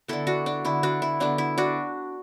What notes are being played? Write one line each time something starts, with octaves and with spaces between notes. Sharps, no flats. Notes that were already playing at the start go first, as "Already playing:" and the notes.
D3 B3 E4 A4
D4 F#4
D4
D3 B3 E4
D4 F#4
E4
D3 B3 D4
E4
D4 F#4